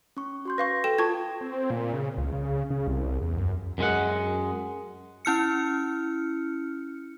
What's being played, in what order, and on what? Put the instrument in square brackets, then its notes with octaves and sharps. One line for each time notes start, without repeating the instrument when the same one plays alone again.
[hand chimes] C#4 C#6
F#4 C6 G6
[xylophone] B4 F5 C#6 [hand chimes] A#6
[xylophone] A4 G5 E7
[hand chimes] F4 A4 A5 [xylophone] C#6 G#6
[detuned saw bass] C4
A#2
C#3
C#2
C#3
C#3
C2
E2
F#2
[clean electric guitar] F#2 G#3 F#5
[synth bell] C#4 E4 F6 C#7